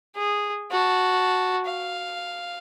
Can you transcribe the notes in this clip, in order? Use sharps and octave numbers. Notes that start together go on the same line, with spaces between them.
G#4
F#4 A5
F5